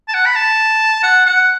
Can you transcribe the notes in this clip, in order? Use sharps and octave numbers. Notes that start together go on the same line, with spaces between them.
A5
F#5
B5
A5
F#5
F#5